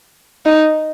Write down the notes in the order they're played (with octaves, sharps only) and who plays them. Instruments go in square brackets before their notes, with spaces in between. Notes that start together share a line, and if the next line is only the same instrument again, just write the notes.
[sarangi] D#4